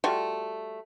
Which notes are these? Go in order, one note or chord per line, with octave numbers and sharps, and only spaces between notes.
G3 A3 F4 F#4